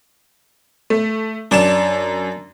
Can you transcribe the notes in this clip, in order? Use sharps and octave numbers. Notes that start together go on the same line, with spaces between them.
A3
F#2 D4 D5 E7